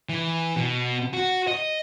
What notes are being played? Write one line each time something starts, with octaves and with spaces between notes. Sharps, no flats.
E3
B2
F#4
D#5